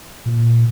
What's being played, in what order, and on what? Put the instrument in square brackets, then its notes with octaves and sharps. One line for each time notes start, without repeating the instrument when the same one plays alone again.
[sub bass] A#2